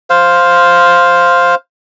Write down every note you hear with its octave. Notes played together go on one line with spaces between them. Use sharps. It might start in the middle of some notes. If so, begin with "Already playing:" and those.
C5 F5